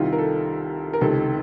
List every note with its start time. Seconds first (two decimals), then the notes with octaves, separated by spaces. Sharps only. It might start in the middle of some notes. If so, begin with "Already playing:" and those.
Already playing: C2 C3 D#3 F4
0.13 A#4
0.18 A4
0.93 A#4
1.01 C#2 C3 D#3 A4